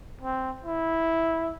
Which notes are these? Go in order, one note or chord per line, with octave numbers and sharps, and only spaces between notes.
C4
E4